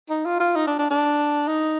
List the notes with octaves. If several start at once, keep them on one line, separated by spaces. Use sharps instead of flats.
D#4
F4
F4
D#4
D4
D4
D4
D#4